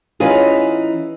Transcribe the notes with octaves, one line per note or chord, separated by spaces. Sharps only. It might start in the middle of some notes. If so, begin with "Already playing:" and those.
E3 C#4 D#4 F4 G#4